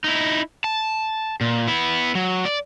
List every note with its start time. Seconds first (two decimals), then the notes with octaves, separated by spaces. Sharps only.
0.04 D#4 E4
0.64 A5
1.41 A#2
1.68 B3 E4
2.15 F#3
2.45 D5